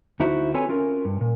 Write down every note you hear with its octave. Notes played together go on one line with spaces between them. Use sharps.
D2 D#4 E4 F#4 C5
C4 F4 A4 B4 C#5 G#5
C#4 F4 A#4
G2
A#2